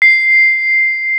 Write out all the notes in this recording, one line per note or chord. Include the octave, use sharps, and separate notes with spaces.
C7